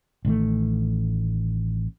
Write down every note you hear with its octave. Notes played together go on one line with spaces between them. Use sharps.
A1 D#3 G#3 A3